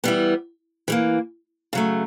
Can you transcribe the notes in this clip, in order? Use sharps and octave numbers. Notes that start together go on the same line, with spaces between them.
E3 G3 B3
E3 G3 A#3
C#3 F#3 A3